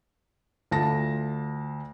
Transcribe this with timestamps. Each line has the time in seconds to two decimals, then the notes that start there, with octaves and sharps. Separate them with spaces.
0.71 D2 F4 A5 A#6